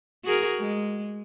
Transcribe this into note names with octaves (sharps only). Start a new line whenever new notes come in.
F#4 G#4 A#4
G#3